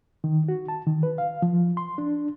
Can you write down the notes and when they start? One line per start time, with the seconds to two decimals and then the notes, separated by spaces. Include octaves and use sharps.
0.24 D#3
0.48 F#4
0.68 A5
0.87 D#3
1.03 B4
1.18 F5
1.42 F3
1.77 C6
1.98 D4